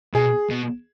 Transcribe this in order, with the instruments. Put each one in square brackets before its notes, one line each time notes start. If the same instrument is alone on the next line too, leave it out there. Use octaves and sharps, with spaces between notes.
[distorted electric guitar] B2 [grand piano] G#4
[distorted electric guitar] B2